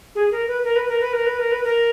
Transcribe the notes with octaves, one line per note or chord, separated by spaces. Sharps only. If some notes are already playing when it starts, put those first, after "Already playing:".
G#4
A#4
B4
A#4
B4
A#4
B4
A#4
B4
A#4
B4
A#4